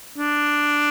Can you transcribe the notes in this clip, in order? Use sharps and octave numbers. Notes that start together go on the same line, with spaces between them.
D4